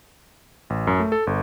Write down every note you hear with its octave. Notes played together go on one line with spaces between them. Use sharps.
A1
F#2
A3
A4
G1